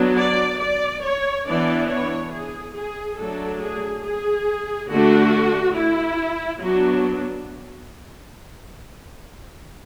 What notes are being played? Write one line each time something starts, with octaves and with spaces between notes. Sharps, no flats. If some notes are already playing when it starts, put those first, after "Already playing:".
Already playing: F#3 B3 D4
D5
D5
C#5
E3 B3 D4 D5
C#5
G#4
G#4
F#3 A3 D4 A4
G#4
G#4
D3 A3 D4 F#4
E4
F#3 B3 D4 F#4